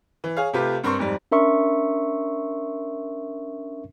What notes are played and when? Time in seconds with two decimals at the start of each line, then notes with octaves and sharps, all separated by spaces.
0.24 E3
0.37 G#4 C#5 F5
0.53 C3 A3 F4 G4 B4
0.84 G2 C4 A#4 C6 C#6
0.99 F2 G#2 G3
1.32 C#4 D4 A#4 E5 C6 C#6